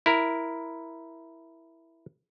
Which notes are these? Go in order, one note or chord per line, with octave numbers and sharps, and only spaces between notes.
E4 A#4